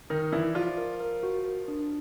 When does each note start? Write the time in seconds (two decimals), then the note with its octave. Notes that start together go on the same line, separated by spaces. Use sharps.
0.10 D#3 D#4 A#4
0.32 E3 E4 D5
0.55 F3 F4 D5
0.78 A#4
1.00 A#4
1.23 F#4
1.45 A#4
1.68 D4